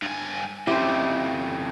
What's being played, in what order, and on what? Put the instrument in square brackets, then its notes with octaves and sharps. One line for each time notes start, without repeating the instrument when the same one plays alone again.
[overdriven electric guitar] G2 G#5
[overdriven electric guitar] F2 C#3 [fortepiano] E4 [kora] G4 C5